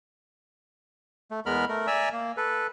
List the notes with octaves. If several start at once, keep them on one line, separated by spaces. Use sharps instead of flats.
A3
E2 G#3 B3 A#4 B5 F6
A3 A#4
D5 E5 G#5 A#5 E6
A#3
A4 B4